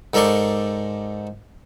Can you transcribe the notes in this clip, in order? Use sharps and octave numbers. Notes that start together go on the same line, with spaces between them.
G#2 A4 A#4 D5 C6 C#6